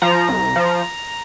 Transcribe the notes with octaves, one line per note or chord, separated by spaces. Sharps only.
F3 A#5
C2
F3